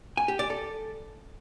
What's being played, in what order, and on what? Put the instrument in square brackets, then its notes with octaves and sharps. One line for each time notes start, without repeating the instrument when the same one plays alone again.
[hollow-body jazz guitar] G#5
G4
D5
A4